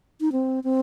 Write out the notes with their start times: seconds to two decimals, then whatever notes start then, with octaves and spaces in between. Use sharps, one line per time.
0.21 D#4
0.32 C4
0.64 C4